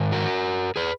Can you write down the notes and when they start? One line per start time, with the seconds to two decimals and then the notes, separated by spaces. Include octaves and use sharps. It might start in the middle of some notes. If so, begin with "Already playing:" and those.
Already playing: G#2 D#3
0.12 F#4 A#4
0.76 G#4 B4